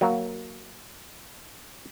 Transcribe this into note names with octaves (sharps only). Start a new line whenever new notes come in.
F#3 A#3